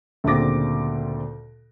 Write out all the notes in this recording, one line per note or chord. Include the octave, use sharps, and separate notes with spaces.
D2 A#2 C#3 C4 D6 A#6